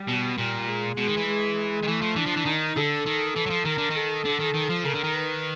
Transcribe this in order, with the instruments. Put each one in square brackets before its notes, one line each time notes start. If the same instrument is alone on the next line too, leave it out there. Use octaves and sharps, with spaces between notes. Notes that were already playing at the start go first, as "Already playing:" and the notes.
Already playing: [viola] G3
[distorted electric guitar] B2
[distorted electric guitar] A#2 [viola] G3
[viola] G#3
[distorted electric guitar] B2 [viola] G#3
[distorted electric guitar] D#3
E3
[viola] G#3
[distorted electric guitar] D#3
[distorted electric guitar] E3 [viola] A3
[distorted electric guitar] F3
[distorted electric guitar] E3 [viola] D4
[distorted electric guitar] F3
E3
[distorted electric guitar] D#3 [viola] D#4
[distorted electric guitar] D3 [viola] A4
[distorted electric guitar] D#3
[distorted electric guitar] E3 [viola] A4
[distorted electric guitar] F#3
F3
[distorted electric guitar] D#3 [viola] A#4
[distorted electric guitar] D3
[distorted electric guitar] D#3 [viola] A4
[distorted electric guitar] D3
D#3
D#3
F3
[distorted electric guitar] C#3 [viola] A#4
[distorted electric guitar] D3
D#3
[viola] B4